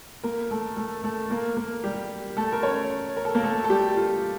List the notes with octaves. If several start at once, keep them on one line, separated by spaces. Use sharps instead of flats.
A#3 A#4
A3 A4
A3 A4
A3 A4
A#3 A#4
A#3 A#4
G3 G4
A3 A4
A#4
C#4 C#5
A#4
A4
A#3 A#4
A3 A4
A4
G3 G4
F4